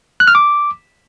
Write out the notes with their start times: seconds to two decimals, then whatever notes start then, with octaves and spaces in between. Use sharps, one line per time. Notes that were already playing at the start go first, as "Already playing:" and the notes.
0.20 F#6
0.27 F6
0.35 D6